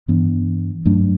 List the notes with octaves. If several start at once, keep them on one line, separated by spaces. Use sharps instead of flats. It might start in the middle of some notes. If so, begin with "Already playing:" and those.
G2 E3 B3 D4
G2 F#3 A3 D4